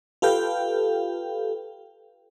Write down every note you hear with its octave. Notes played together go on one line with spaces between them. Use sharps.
F4 G4 A4 B4 F5 G5